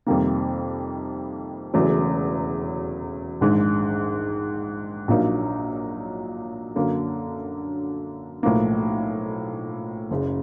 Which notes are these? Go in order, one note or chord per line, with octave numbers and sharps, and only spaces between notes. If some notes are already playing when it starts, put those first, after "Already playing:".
F2 C3 D#3 G3 A#3
E1 E2 C#3 F#3 A3
A#1 G#2 D#3 G#3
A#1 A#2 F#3 A#3 D#4
F#2 D3 F#3 A#3
B1 A2 F3 A#3
F#1 F#2 C#3